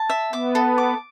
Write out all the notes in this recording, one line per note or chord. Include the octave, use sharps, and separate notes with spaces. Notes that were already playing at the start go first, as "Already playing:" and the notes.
Already playing: A5
E5
B3 D6
A4
D6